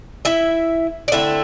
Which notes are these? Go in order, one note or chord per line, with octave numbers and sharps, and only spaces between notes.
E4 E5
D5
D3 A3 C4 E4 E5